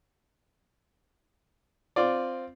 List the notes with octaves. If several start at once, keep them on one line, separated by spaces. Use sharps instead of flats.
C4 F4 D5